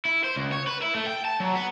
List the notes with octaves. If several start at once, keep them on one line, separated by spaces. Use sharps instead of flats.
E4
C5
C#2
C#5
B4
E4
A3
G5
A5
F#3
B3